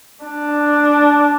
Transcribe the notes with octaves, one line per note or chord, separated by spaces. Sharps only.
D4